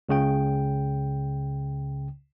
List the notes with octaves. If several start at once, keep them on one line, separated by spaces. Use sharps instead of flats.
C#2 C#3 G5